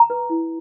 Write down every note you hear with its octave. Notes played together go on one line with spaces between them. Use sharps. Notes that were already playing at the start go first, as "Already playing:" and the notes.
Already playing: A#5
B4
E4